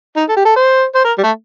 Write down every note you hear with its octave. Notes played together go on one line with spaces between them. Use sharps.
D#4
A4
G4
A4
C5
C5
A#4
G3
A3